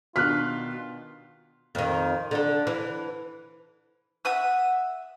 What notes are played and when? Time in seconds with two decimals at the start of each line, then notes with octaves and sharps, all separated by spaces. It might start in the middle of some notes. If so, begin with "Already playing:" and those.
0.16 B2 D#3 D4 F4 G4 F6 F#6 B6
1.75 F2 D#3
2.31 D3 A4
2.67 E3
4.25 E5 F#5 D#6 E6